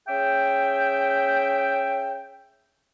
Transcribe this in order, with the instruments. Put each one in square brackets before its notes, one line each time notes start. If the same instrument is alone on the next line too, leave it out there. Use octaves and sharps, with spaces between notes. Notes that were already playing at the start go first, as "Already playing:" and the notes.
[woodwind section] C#4 G#4 E5 G5